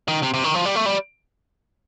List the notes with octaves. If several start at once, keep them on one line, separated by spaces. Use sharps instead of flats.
D#3
C3
C3
D#3
F3
G3
A3
G3